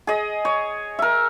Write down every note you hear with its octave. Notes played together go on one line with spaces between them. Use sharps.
G#4 D#5
C#5
A#4 E5